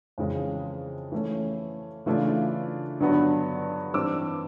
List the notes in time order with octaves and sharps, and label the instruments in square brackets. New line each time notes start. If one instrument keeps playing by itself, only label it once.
[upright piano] F2 C#3 E3 G#3 C#4
E3 A3 C#4
C#3 E3 A3 D4 F4
G2 D3 F#3 B3
G2 E3 G3 C4 D6 E6